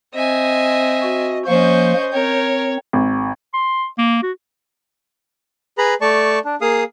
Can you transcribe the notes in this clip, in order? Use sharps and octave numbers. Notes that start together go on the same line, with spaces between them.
C4 D#5 E5 G#5
F#4
F3 A#3 C#4 C5 D#5 C#6 G6
C4 A#4 C#5
G#1
C6
A#3
F#4
G#4 B4 A#5 B5
A3 D5 A5 C#6
D4
A#3 G#4 F5 D#6